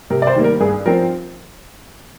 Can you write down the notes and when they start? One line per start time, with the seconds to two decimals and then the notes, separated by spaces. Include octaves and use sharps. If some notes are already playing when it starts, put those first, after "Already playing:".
0.10 C3 A#4
0.22 D5
0.27 C5
0.35 D#3 G3 A#3
0.44 A#4
0.60 G2 G#4
0.86 F3 C4 A#4